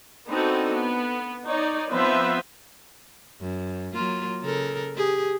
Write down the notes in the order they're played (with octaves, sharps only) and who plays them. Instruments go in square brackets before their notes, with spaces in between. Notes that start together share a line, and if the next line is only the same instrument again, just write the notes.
[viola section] B3 C4 D4 D#4 F#4 A4
B3
D#4 C#5 D5
F3 B3 C4 B4 C5 E5
[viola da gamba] F#2
F#3 A#3 F4
C#3 A4 A#4
G4 G#4